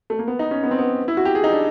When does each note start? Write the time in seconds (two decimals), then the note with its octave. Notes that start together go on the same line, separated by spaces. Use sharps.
0.10 A3
0.19 A#3
0.28 B3
0.39 D#4
0.51 C#4
0.63 B3
0.71 C4
0.79 B3
1.08 E4
1.17 F#4
1.25 G4
1.35 G#4
1.44 D#4
1.53 D4